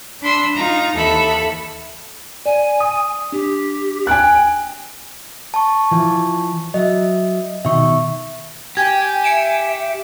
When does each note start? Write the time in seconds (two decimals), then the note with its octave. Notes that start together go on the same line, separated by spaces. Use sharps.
0.21 D4 B5 C6 E6
0.56 D#4 F4 A#5
0.94 D#2 E3 A4 E5 B5
2.46 D5 G#5
2.80 D#6
3.32 D4 G4
4.07 G5 G#5 F#6
5.54 A5 C#6
5.91 E3 F3
6.74 F#3 D#5 E5
7.65 B2 D#3 E5 C#6
8.77 G4 G5 G#5 G#6
9.24 E5 C#7 D7 E7